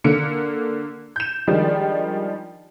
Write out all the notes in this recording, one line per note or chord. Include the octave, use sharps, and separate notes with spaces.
D3 A#3 C#7 D7
G6 E7
D#3 F3 G3 G#3 D4